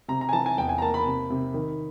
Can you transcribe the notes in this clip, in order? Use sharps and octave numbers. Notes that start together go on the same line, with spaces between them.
C3 A#5
A#5
G#5
E3 A5
G#5
E2 G5
G#5
A#5
A#3 A5
B5
C3
C3
D#3